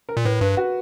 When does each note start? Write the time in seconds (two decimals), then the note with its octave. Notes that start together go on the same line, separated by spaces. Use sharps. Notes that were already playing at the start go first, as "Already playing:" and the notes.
0.09 A#4
0.17 A#2
0.25 A2 B4
0.41 G2 B4
0.57 F#4